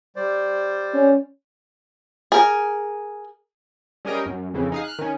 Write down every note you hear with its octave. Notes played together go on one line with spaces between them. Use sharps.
G3 C5 D5
C#4
G#4 A#4
G3 C#4 G#4 A#4 D#5 G5
F#2
F2 C#3 E3
D#4 G#4 F5
F6 F#6
D#3 C#4